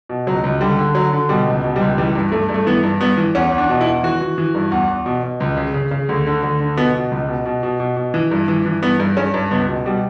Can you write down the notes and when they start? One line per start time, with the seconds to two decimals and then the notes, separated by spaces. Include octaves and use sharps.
0.09 B2
0.27 C#2 F#3
0.44 C#2
0.61 D3 G3
0.79 D3
0.95 D3 F#3
1.13 D3
1.29 B2 G3
1.47 C#2
1.64 B2
1.76 G3
1.81 C#2
1.98 E3 G3
2.15 G2
2.32 G2 A3
2.49 G2
2.54 A3
2.67 E3 B3
2.84 G2
3.01 G2 B3
3.17 E3
3.35 E2 C#4
3.52 E2
3.58 D4
3.69 B2
3.81 E4
3.87 E2
4.03 E3 F#4
4.21 E3
4.38 E3
4.55 G2
4.72 E2
4.89 E2
5.06 B2
5.23 B2
5.40 C#2
5.57 C#3
5.74 C#3
5.91 C#3
6.09 D2
6.27 D3
6.42 D2
6.60 D3
6.77 B2 B3
6.95 B2
7.11 C#2
7.28 B2
7.46 B2
7.63 B2
7.80 B2
7.97 B2
8.14 E3
8.31 G2
8.48 E3
8.66 E3
8.82 G2 B3
9.00 G2
9.17 G2 C#4
9.34 G2
9.51 C#2 B3
9.68 B2
9.85 B2 G3